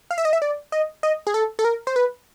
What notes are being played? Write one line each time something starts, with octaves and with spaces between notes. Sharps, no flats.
F5
E5
D#5
E5
D5
D#5
D#5
G#4
A4
A4
A#4
C5
B4